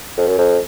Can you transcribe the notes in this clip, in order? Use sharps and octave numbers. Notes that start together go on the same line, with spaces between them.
F2
F#2
F2